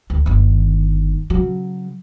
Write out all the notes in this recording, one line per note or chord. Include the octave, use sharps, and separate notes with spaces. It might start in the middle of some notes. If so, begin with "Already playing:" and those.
D2
G1 D#3
C#3 F#3